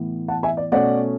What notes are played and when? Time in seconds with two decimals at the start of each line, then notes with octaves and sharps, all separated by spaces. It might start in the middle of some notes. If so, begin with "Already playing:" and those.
Already playing: A2 E3 B3
0.28 F#5 A5
0.43 E5 G#5
0.57 D5
0.72 B2 A3 C#4 D5 F#5